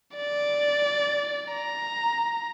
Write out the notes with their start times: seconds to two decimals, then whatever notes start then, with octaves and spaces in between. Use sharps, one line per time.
0.16 D5
1.52 A#5